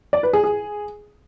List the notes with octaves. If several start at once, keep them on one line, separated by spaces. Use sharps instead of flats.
D5
B4
G#4
G#4